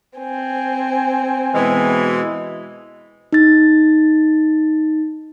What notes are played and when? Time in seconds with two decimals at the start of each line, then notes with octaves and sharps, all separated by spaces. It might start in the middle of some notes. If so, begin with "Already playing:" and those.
0.18 C4 G#5
1.54 B2 E3 G#3
3.33 D#4 A6